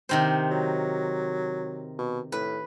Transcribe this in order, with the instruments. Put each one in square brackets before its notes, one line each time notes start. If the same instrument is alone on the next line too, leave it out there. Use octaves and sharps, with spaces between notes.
[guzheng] C3 D#3 C5
[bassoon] F#3
B2
[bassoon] A2 [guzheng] B4